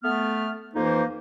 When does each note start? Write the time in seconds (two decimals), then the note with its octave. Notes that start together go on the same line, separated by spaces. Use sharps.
0.04 A3 B3 F6
0.75 F2 E3 A#3 D#4 C5